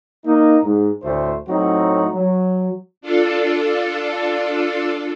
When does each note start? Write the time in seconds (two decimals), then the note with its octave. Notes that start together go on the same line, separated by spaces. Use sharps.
0.26 A#3 D#4
0.64 G#2
1.03 D2 A2 A3 C5
1.49 A2 F#3 C4 D#4 F#4
2.14 F#3
3.01 D4 F4 A4